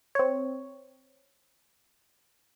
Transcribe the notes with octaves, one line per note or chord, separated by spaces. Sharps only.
C4 C#5